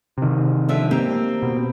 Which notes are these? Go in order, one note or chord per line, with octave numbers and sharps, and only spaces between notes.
C3 D#3
D3 F3 E5
A#3 C4 G4
B2